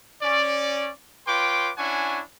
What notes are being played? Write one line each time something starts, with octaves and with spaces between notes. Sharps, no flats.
C#4 D5
F4 B4 C#5 G5 C6 D6
C#4 D4 E4 F#5 G#5 C#6